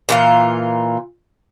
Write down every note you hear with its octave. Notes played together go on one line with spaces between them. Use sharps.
A#2 E3 F4